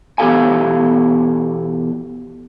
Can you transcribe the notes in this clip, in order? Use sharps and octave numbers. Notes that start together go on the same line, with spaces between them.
E2 B2 G4 A4 F5 G#5